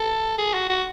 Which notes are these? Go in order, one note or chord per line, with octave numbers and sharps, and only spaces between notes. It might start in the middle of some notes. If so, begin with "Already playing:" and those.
Already playing: A4
G#4
F#4
F#4